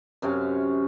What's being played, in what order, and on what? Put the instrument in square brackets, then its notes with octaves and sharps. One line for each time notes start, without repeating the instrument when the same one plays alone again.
[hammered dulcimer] F#2 C3 C#4 F5